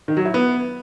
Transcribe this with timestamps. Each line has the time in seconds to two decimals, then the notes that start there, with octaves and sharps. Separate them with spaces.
0.08 D#3
0.17 F#3
0.25 E4
0.34 B3